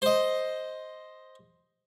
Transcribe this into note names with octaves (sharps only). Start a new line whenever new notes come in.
C5 D#5